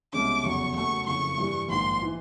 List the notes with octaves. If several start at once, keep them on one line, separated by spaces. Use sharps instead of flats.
C2 B2 G#3 C#4 D6
F1 E2 C#3 F#3 C#6
F#2 C#3 F#3 A3 C#6
F#1 F2 C#3 C#6
G2 E3 G3
A#1 G#2 D#3 C6
E3